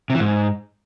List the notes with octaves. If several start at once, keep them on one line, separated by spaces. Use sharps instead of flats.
C3
E3
G#2